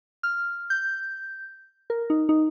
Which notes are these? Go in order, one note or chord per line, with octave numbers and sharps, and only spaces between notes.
F6
G6
A#4
D#4
D#4